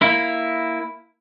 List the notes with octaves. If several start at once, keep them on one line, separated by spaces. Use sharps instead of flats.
A#3 E4